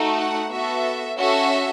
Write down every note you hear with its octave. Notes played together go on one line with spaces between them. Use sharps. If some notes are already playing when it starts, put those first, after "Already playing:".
Already playing: A3 D#4 F#4
F#5
B3 F#4 A4 E5
C#4 F#4 A4 E5